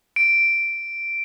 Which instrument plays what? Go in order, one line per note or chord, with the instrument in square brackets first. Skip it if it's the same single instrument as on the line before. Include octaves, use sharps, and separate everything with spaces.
[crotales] D7